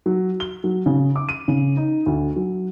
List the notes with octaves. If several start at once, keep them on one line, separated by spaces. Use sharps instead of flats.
F#3
G7
F#3
C#3
D6
D#7
C#3
D#4
D2
F#3